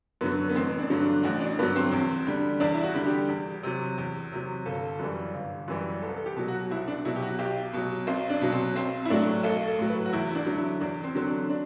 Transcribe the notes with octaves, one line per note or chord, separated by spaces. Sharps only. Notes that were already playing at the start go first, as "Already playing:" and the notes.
F#2 D3 F#3 B3
B3
A1 C4
D4
G2 D3 F#3
D4
A1 F#4
D4
G2 D3 F#3 B3
C4
E2
D3 G3
E2 D4
E4
F#4
D3 G3
G4
E2
C3 F#3
E2
C3 F#3
G1 A4
F#2 E3 G3
G1
F#2 E3 G3
C2 A4
A4
G4
B2 F#3
F#4
C2 E4
D4
B2 F#3 E4
G4
F#4
B1 G4
B2 F#3
B1 C4
D4
B2 F#3
C4
B1 C4
E4
A2 F#3 D4
B1 A4
A4
A2 F#3
B4
F#4
E2 E4
E4
D4
D3 F#3
E4
E2 D4
C4
D3 F#3 C4
D4
D4